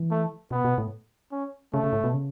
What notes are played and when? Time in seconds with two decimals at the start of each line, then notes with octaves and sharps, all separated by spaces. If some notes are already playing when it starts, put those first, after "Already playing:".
Already playing: E3
0.11 A3
0.51 B2 B3
0.65 B2
0.78 A2
1.32 C#4
1.73 C#3 A3
1.84 C#3
1.93 A2
2.04 B2
2.14 C#3